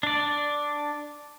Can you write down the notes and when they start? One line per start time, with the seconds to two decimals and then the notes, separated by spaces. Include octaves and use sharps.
0.03 D4 D5